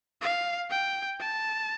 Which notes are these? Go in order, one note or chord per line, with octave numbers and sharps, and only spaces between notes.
F5
G5
A5